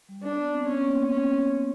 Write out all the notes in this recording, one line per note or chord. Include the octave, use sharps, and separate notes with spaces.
G3
D4
B3
C4
B3 C#4
A#3
C4
C#4